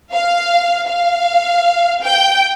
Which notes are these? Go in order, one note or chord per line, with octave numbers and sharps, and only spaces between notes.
F5
F5
G5